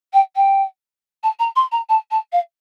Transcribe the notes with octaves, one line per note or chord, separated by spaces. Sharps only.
G5
G5
A5
A#5
C6
A#5
A5
A5
F5